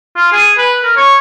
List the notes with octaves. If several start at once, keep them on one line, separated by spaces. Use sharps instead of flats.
F4
G#4
B4
A#4
C#5